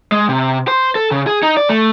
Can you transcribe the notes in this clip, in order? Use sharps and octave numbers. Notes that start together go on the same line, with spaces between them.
G#3
C3
C5
A4
C#3
G#4
D#4
D5
A3